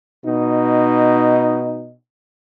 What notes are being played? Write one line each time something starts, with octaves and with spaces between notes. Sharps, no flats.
B2 D#4